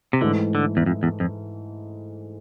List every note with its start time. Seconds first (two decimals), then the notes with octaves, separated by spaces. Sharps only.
0.13 C3
0.21 G#2 D3 E3 A3
0.55 D3
0.77 E2
0.86 F2
1.03 E2
1.20 F2